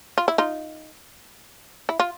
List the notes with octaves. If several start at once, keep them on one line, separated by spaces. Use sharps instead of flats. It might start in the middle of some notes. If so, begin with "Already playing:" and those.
F4
E4
D#4 F4
E4
F4